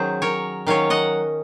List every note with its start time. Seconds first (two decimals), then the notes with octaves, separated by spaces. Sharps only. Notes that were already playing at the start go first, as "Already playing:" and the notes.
Already playing: D#3 F#3 C#4 G#4 C5
0.22 A#4 C#5
0.67 D#3 F#3 C#4 C#5 F5
0.90 D#5 F#5